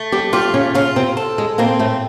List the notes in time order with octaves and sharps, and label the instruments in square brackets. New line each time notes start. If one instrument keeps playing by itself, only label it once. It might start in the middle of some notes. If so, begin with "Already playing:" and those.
Already playing: [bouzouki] A3
[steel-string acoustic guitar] G3 G4
[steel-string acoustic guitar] G3 G4 [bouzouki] F4
[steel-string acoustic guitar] C#3 C#4
[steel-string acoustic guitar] C#3 C#4 [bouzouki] F4
[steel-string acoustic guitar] C3 C4
[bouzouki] A4
[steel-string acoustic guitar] G#3
[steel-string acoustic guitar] A#2 A#3 [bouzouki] C4
[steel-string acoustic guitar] A2 A3